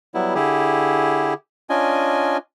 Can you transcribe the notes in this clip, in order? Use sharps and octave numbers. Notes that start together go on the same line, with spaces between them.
F#3 G3 B3 E4
D3 E4 G4 G#4
C#4 D4 F4 D#5 G#5